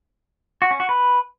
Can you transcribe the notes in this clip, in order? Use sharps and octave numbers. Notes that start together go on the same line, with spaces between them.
F#4
C#4
F#4
B4